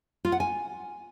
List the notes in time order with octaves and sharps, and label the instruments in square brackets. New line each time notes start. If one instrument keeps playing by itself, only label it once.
[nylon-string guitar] F4
F#5
G#5